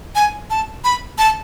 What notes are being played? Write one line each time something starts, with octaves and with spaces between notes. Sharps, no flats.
G#5
A5
B5
A5